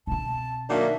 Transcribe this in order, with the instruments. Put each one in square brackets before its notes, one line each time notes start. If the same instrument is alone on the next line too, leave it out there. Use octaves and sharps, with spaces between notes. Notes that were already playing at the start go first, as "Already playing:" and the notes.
[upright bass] B2 C4 [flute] A5
[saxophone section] D#3 F#3 A#3 [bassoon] D4 [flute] E5